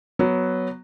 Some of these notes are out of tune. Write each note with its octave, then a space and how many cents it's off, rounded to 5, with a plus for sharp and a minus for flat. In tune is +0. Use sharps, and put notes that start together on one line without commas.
F#3 +0 B3 +0